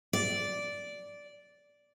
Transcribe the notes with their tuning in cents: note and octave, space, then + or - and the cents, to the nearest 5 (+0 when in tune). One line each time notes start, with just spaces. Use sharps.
D5 -10